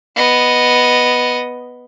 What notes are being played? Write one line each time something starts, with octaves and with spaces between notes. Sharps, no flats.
B3 D#5